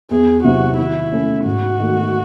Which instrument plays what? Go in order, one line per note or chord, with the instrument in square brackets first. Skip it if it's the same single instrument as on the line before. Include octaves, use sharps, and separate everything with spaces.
[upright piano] E2 [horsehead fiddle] G#4
[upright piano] C3 F#3 C4 E4 [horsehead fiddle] F#4
[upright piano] D#3 [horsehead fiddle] E4
[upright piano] A3 C#4
[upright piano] G#2 [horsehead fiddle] F#4
[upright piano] D#3 A3